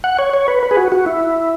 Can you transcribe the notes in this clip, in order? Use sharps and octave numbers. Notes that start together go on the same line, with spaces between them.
F#5
C#5
C#5
B4
B4
G#4
F#4
F#4
E4